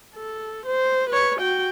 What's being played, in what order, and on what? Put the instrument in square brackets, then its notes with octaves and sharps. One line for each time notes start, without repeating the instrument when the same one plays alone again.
[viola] A4
C5
B4 C#5
F#4 G5